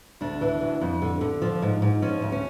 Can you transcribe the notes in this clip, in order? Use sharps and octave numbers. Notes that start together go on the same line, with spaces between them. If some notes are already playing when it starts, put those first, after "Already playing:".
D2 D4
E3
D2
F2
D3
D3
F3
G#2
G#2
F3 C#4
D2
C#4